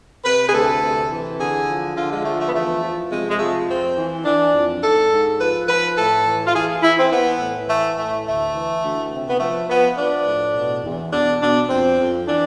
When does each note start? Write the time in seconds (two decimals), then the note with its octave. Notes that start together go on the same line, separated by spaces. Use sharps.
0.24 C3 B4
0.48 G#4
0.53 D2 A4
0.82 C3
1.10 E3
1.39 D3 G#4
1.68 F3
1.96 D3 F4
2.11 G#3
2.25 F3 A3
2.39 A3
2.49 B3
2.53 E2 A3
2.82 F3
3.11 C3 G#3
3.30 G#3
3.39 F3 A3
3.68 F2 C4
3.97 E3
4.25 E3 D4
4.54 F2
4.82 G#2 A4
5.11 G#2
5.40 F3 B4
5.68 F3 B4
5.97 A2 A4
6.26 E3
6.47 F4
6.54 E3 G#4
6.83 E3 E4
6.97 C4
7.11 E3 B3
7.40 A2
7.69 E3 A3
7.97 A2 A3
8.26 D2 A3
8.55 E3
8.84 D2
9.12 C3
9.29 B3
9.40 F3 A3
9.69 F3 B3
9.97 F3 D4
10.26 A2
10.55 B2
10.84 E2
11.12 B2 D4
11.41 B2 D4
11.69 F2 C4
11.98 F2
12.27 E3 D4